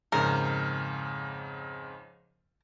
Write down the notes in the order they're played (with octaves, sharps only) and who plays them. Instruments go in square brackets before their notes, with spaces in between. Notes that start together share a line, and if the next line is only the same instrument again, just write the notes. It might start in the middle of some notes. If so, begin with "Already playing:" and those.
[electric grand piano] F2 G#2 C#3 [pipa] A#4